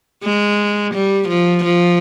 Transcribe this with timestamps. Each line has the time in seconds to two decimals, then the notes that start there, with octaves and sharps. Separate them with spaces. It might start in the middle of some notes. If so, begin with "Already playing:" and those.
0.24 G#3
0.94 G3
1.29 F3
1.64 F3